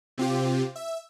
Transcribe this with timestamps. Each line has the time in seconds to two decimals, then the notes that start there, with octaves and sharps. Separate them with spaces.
0.18 C3 C4 F4 G4
0.76 E5